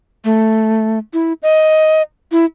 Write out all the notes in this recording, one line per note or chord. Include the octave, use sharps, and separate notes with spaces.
A3
E4
D#5
E4